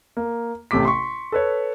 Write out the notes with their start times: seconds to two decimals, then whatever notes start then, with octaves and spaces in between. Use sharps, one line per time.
0.17 A#3
0.71 A1 C3 A3 D6 B6
0.85 C6 C#6
1.32 A4 B4 C#5